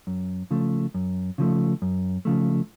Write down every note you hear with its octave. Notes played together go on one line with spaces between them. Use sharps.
F#2
C#3 F3 A3
F#2
C#3 F3 A3
F#2
C#3 F3 A3